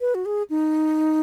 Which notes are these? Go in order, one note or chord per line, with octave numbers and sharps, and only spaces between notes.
B4
F#4
G#4
D#4